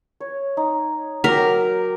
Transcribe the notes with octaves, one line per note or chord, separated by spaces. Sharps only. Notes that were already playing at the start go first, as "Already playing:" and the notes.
C#5
D#4
F#3 A#4 G5 D6